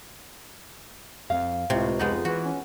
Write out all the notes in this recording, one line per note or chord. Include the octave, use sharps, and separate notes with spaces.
F2 F5
C#2 A2 C3
F2 G#3 B3 D#4 F4
E3 F#4
C#4